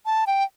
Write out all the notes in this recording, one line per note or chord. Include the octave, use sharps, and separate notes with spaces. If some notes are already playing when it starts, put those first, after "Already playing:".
A5
G5